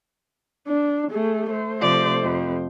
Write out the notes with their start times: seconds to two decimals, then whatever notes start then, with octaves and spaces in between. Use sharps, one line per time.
0.67 D4
1.11 A3 G#4
1.51 A3 C5
1.81 C3 F3 D5
2.22 F2